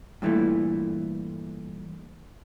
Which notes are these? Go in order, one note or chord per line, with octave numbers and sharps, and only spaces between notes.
G2 A#2 E3 G3 A3